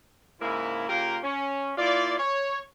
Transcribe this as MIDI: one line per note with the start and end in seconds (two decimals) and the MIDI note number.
0.40 0.88 44
0.40 0.88 49
0.40 0.88 58
0.40 0.88 64
0.88 1.17 49
0.88 1.17 58
0.88 1.17 65
0.88 1.17 67
0.88 1.17 70
1.23 1.72 61
1.77 2.17 58
1.77 2.17 64
1.77 2.17 65
1.77 2.17 74
2.18 2.60 73